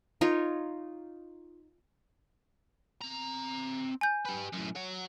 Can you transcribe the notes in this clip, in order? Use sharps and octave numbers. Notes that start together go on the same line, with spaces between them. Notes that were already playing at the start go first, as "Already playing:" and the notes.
D#4 F4 A#4 C#5
C4 A#5
G#5 G6
G4 B4
F#2 A2
C#5 F#5